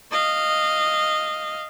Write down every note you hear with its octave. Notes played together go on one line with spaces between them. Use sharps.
D#5 F5